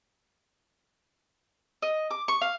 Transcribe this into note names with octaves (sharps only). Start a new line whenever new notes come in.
D#5
D6
C#6
F5